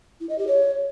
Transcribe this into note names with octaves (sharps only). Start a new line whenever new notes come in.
E4
D#5
G4
C#5